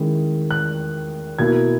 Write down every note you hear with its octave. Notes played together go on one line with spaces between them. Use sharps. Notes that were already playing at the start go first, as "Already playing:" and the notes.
Already playing: D#3 G#3 C#4 E4
F#6
B2 A#3 E4 G#6